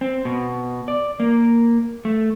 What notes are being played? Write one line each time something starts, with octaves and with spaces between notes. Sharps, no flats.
C4
B2
D5
A#3
A3